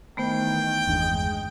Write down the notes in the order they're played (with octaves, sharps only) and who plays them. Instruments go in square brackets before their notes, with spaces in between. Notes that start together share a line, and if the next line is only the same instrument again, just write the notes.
[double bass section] D#3 E3 [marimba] A3 B3 C5 [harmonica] G5
[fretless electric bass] G1 E2 D4 [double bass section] G#3